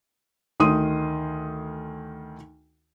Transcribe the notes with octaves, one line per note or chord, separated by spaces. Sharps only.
D2 D#3 C6 D#6 D#7